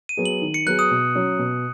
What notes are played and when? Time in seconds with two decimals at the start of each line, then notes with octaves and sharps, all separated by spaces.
0.09 D#7
0.17 F#3 B3 G#4
0.26 F#7
0.42 D#3
0.54 C#7
0.66 F#3 B3 G#4 F#6
0.79 D#6
0.91 B2
1.15 F#3 C#4
1.39 B2